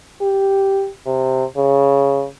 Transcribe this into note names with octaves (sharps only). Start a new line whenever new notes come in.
G4
C3
C#3